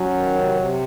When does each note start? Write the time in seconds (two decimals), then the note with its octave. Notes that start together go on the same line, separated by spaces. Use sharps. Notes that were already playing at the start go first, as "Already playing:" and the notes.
Already playing: F#3 C#4
0.12 D#3
0.34 C3
0.56 C3